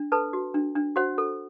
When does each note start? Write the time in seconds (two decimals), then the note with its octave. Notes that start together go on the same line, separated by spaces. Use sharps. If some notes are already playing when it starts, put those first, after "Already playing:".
Already playing: D4
0.12 A4 B4 A5
0.33 F#4
0.54 D4
0.76 D4
0.96 F#4 C5 F#5
1.18 A4